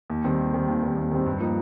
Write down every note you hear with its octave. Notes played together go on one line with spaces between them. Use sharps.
D#2
D#3 G3 C4
D#2
D#3 G3 C4
D#2
D#3 G3 C4
D#2
D#3 G3 C4
G2
F3 A#3 D#4